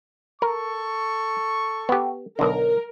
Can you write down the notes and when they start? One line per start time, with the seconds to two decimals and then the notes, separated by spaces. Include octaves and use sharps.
0.42 A4 A#4 C#6
1.89 B3 G4
2.39 B1 D3 A#4